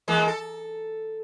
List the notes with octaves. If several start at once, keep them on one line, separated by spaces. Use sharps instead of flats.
E3 G#3 A#3
A4